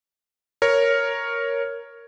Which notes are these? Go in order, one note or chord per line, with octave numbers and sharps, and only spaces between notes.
A#4 C#5